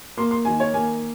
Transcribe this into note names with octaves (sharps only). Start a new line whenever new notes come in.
A#3 C6
C6
D#3 G#5
C#5
A#3 G#5